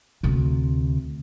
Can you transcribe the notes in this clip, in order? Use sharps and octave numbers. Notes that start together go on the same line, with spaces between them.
D2 C3